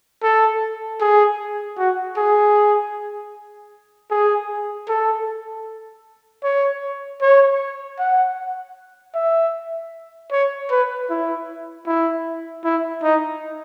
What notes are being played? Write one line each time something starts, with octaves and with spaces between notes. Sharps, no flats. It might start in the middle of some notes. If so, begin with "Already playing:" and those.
A4
G#4
F#4
G#4
G#4
A4
C#5
C#5
F#5
E5
C#5
B4
E4
E4
E4
D#4